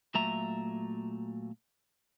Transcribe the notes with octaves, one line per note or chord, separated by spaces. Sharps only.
A#2 F#3 A3 E5 A#5